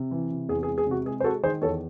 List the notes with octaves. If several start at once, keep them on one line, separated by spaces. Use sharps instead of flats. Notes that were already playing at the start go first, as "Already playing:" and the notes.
Already playing: C3
E3
C3
E2 G#4
G#4
G#3
G#4
C3 F#4
G#3 G#4
C5
G#3 F#4 A4
D#3 G#4 C5
E2 A4 C#5